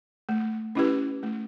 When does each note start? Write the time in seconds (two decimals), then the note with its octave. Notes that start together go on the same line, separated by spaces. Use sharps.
0.29 A3
0.75 C#4 E4 G4 B4
1.23 A3